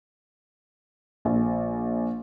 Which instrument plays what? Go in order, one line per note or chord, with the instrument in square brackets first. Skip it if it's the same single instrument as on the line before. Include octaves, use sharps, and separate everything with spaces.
[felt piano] A#1